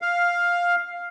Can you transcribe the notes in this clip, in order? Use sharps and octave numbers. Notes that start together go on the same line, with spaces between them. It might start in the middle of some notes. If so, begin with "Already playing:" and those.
F5